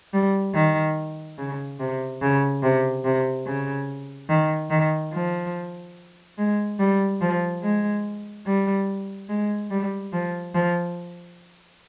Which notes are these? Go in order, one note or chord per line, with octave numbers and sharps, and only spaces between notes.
G3
D#3
C#3
C3
C#3
C3
C3
C#3
D#3
D#3
F3
G#3
G3
F3
G#3
G3
G#3
G3
F3
F3